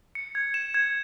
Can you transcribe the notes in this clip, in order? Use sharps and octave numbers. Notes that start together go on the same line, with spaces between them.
C#7
G#6
E7
G#6